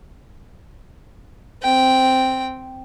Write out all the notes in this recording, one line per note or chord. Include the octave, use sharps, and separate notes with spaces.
C4 G5